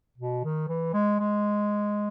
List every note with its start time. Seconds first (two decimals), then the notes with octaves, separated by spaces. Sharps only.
0.18 B2
0.44 D#3
0.68 E3
0.94 G#3
1.19 G#3